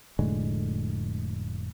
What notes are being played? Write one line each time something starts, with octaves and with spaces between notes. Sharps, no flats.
F1 A2 D3 G#3